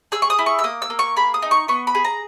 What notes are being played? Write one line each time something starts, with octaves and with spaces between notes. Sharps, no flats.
G#4 E6
C#6
D#6
E4
C#6
E6
A#3 D#6
E6
A#3
C#6
G#4 B5
D#6
D#4
C#6
B3 C#6
B5
G#4
A#5